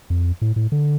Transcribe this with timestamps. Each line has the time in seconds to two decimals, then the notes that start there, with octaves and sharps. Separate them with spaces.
0.10 F2
0.42 A2
0.56 A2
0.72 D3